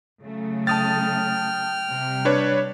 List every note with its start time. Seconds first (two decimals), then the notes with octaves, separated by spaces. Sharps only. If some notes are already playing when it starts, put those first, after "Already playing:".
0.23 C#3 F#3 A3
0.67 G5 A5 D#6 F6 A6
1.91 C3 G3
2.25 D4 B4 C#5